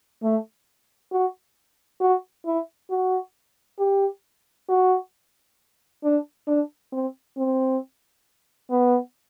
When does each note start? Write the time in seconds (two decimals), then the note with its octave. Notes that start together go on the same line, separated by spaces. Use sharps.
0.23 A3
1.12 F#4
2.01 F#4
2.45 E4
2.91 F#4
3.79 G4
4.69 F#4
6.04 D4
6.47 D4
6.92 C4
7.37 C4
8.70 B3